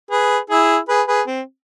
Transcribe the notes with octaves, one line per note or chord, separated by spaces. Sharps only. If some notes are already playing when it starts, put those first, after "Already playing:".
G#4 B4
E4 G#4
G#4 B4
G#4 B4
C4